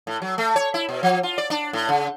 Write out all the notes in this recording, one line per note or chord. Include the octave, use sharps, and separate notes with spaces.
A2
F#3
A3
C#5
E4
B2
F3
F4
D5
D4
A2
C#3